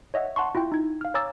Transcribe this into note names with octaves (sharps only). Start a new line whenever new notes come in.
C#5 D#5 E5 F#5
F#5 A5 C6 C#6
E4 F4 E5 G5
D#4 G#6
F5 F6
C#5 G#5 A#5 D6 E6 A6